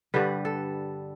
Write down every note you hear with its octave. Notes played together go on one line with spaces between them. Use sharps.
G2 D3 G3 B4
A4